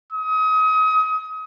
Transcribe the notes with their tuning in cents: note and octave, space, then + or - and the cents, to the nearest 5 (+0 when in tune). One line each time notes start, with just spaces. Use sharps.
D#6 +30